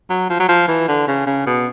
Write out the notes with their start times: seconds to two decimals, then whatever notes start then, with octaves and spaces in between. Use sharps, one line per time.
0.10 F#3
0.30 F3
0.40 F#3
0.49 F3
0.68 E3
0.88 D3
1.08 C#3
1.26 C#3
1.46 B2